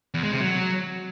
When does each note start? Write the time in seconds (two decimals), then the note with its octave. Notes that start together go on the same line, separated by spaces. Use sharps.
0.14 E2
0.23 G#3
0.32 C3
0.41 F#3